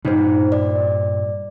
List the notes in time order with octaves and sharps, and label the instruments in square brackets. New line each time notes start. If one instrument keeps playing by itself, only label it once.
[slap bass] G2 A#2 [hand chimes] D#4 C5
[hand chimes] D5